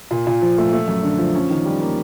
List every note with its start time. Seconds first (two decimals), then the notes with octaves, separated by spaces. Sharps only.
0.11 A#2
0.27 A#2
0.42 F3
0.58 A3
0.73 A3
0.88 F#2
1.03 D3
1.19 F3
1.35 C#4
1.50 D#3
1.65 G3
1.81 A#3